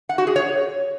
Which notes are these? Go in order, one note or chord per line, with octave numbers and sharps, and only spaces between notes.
F#5
F#4
G#4
C#5